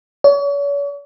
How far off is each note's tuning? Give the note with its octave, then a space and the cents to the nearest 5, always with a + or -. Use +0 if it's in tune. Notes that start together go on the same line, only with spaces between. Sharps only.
C#5 +40